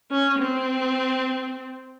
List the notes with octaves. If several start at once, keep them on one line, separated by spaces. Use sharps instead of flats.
C#4
C4